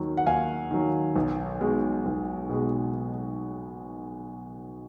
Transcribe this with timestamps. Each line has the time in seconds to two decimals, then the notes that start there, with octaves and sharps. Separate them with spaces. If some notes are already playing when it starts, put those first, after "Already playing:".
Already playing: D#2 D#3 F#3
0.17 F#5
0.26 D#2 F5 G#5
0.71 D#3 F#3
1.16 B1
1.60 B2 G#3
2.06 B1
2.49 B2 G#3